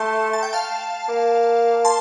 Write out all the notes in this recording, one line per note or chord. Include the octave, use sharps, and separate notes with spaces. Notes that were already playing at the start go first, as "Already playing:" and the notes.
Already playing: A3 A5 C6
A5
G5
F5 A5
A#3
A5 C6